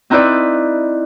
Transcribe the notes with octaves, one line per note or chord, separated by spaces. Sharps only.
C4 D#4 E4 B4 D5